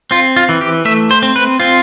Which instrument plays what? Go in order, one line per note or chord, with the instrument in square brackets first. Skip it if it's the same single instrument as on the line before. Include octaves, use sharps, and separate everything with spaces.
[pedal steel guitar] C4 F4
F4
E3
G4
A3 E5
C5
C4
B4
C4 F4